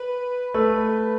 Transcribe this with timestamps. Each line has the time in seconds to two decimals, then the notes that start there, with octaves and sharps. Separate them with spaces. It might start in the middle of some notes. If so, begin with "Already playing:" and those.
Already playing: B4
0.54 A3 B4